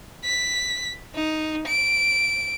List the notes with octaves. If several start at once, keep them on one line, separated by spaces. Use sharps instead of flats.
B6
D#4
D7